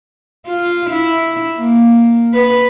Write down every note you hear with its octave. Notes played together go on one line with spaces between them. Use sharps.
F4
E4
A#3
B4